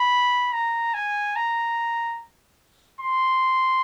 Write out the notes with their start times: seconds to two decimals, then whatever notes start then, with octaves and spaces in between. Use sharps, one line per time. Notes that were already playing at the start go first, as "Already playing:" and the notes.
Already playing: B5
0.53 A#5
0.94 G#5
1.36 A#5
3.01 C6